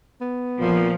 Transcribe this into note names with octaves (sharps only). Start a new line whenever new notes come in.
B3
A#2 F3